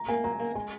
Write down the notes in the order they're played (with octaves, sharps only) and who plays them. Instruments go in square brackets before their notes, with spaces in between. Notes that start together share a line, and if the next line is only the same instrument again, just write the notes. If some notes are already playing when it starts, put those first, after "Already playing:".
Already playing: [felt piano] A#5
[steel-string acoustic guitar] A#3 [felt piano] G#5
[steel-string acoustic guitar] F#3 [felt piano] A#5
[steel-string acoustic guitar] A#3
[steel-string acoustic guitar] G#3 [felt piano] G#5